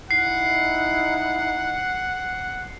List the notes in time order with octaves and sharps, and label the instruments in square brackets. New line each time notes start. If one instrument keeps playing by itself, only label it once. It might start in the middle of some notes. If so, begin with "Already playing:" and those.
[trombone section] D#4 E4 [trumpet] F#5 [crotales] C7